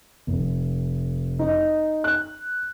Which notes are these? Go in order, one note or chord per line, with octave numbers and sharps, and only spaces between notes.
F1
D#4
F#6